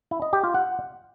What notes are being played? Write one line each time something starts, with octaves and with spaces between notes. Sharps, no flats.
E4
D#5
G4
F4
F#5